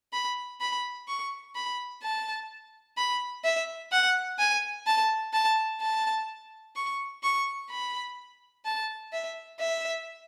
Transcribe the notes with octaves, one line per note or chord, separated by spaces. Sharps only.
B5
B5
C#6
B5
A5
B5
E5
F#5
G#5
A5
A5
A5
C#6
C#6
B5
A5
E5
E5